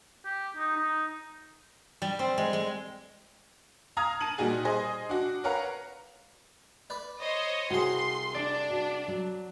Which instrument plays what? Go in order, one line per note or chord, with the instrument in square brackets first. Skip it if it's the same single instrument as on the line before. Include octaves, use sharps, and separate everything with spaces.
[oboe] G4
D#4
D#4
[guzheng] G3
C4
G#3
G#3
[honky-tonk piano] F5 A#5 D#6 F6 G#6
A5 D#7 F#7
A#2 G3 D#4 F#4 G#4
G#4 C5 D#5 G#5
D4 F#4
A#4 B4 C#5 F5 F#5 A#5
[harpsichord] B4 D5
[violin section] C5 C#5 D#5
[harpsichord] C2 G#4 [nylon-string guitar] F#4 [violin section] C6
[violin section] D4 [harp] D5
[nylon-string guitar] F#4
F#3